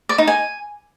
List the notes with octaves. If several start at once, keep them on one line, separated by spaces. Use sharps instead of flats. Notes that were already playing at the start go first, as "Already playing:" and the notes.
D5
D#4
G#5